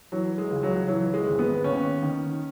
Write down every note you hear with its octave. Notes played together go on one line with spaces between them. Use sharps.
E3 F#3
G#3
C#2
F#3
E3 F#3
G#3
G#1
B3
D#2 C#4
D#3